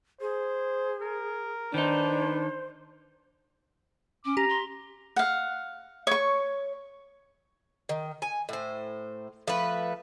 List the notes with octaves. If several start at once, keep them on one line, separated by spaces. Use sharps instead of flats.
G#4 C5
A#4
D#3 D4 D#4 B4 C5
C#4 D6
G4 A#5
C6
F5 F#5
C#5 C#6
D#3
G#5
A2 C5
F3 A3 B4